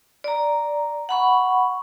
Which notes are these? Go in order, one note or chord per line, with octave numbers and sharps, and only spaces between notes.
D5 A#5
F#5 B5 C#6